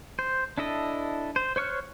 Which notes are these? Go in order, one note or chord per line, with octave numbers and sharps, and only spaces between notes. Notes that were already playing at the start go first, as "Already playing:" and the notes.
C5
D4 E4 A4 D#5
C5
C5 C#5 C#6 F6 F#6